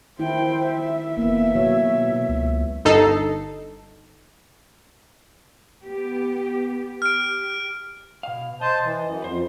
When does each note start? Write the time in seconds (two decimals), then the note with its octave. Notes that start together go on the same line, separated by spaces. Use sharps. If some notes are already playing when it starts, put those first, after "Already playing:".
0.19 D#3 E4 C5 G5
0.70 E5
1.17 F1 A#3 B3
1.55 B2 F#3 C#5
2.29 C#2
2.85 G1 D#4 A4 C7
5.85 B3 G4
7.02 G4 F6 D7
8.23 B2 F5
8.61 C5 D#5 A5
8.84 E3
9.05 F#2
9.22 F2 B4 C5